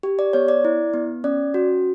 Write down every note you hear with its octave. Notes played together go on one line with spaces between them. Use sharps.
G4
D5
B3 C#5
D5
E4
B3
C#4 D5
F#4